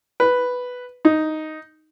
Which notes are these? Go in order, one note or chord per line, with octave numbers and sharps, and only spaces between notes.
B4
D#4